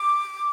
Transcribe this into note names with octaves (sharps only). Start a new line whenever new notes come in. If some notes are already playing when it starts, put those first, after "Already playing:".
Already playing: D6